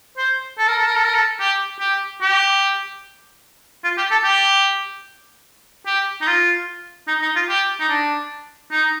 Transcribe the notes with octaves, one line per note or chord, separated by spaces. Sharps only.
C5
A4
A#4
A4
A#4
A4
A#4
A4
G4
G4
G4
F4
G4
A4
G4
G4
D#4
F4
D#4
D#4
F4
G4
D#4
D4
D#4